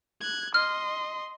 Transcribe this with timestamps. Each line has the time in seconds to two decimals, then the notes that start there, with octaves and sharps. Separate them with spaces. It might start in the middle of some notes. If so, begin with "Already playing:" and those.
0.21 F#6 G#6
0.54 D#5 C6 F6